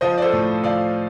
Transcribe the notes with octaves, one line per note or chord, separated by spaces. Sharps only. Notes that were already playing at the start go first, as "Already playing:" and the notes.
F3 C5 D#5
D5
A4 C5
A2
F3 D5 F5